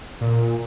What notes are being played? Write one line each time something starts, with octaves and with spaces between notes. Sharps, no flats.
A#2